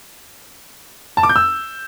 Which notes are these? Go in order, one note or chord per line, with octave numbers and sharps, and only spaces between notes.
A5
D6
G6
E6